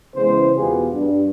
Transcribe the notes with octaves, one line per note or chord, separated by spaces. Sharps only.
C#3 E3 G#3 B3 E4 C5
E2 B2 B3 F4 G4 G#4
G2